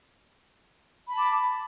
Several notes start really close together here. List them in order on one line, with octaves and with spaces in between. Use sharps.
B5 A5 D6